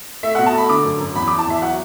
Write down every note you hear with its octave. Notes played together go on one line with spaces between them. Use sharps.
A3 E5
B2 F#5
A5
A3 B5
D3 D6
F#2
F#2
E2 B5
D6
E3
A5
E2 E5
F#3 F#5